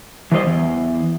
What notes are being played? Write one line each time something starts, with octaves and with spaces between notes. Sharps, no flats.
E3 G3 C5 D#5
E2